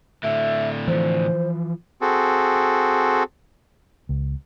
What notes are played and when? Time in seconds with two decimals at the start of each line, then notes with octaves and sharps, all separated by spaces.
0.23 A2 D3 E5
0.88 E3 F3 C5
2.01 C4 F#4 G#4 A4
4.09 C#2